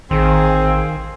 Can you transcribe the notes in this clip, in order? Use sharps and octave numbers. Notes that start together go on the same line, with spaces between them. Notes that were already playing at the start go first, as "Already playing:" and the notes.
A1 D#3 C4 G#4 F5